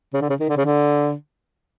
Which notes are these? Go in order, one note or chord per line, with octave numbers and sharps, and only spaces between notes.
C#3
D3
C#3
D#3
D3
C#3
D3